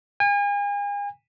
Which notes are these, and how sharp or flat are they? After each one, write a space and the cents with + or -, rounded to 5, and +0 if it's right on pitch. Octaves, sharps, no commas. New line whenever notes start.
G#5 -40